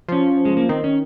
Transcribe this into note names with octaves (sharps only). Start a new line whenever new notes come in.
F3 C#4
G#3
A#3
D#3 C4
C#4